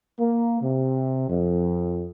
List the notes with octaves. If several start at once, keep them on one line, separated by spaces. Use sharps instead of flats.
A#3
C3
F2